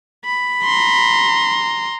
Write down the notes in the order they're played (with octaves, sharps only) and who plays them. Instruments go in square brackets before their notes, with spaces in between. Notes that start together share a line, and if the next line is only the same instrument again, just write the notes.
[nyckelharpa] B5
[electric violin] A#5 C6